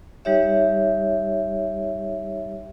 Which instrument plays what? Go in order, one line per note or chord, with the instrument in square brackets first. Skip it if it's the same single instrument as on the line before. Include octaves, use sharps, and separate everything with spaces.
[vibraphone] G3 D#4 G4 C#5 E5